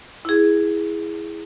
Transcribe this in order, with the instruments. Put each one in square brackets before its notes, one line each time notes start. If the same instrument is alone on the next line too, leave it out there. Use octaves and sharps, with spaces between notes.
[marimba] E4 G#4